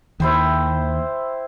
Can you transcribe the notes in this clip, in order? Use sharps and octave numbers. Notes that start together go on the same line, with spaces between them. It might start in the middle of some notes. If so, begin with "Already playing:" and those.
D#2 E4 C5 G5